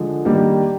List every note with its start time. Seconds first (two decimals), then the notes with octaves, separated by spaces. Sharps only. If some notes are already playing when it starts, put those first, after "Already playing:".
Already playing: D3 F3 G#3
0.25 D#3 G3 A#3 D4 G4